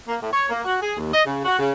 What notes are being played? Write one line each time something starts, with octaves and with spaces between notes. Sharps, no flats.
A#3
A2
C#5
A#3
F#4
G#4
D#2
D#5
C#3
F#4
C#3